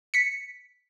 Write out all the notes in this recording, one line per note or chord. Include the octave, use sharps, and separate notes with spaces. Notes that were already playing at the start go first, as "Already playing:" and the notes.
B6 C#7